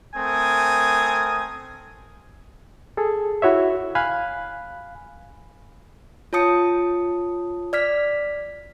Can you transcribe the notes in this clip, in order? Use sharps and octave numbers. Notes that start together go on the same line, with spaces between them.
A3 C4 A#4 G#5 D#6
G#4 A4
E4 F#4 C#5 E5
F5 G#5 B5 F#6
F4 C#5 A5 D#6 C#7
D5 F6 B6